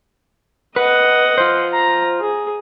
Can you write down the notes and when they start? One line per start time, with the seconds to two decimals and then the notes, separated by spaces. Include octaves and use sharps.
0.76 B4 D#5 F#5
1.38 F4 C5
1.73 A#5
2.20 G#4